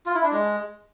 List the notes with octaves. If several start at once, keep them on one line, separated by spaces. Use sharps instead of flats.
F4
E4
D4
G#3